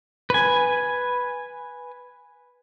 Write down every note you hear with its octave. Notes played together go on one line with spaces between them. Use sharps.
B4 G#5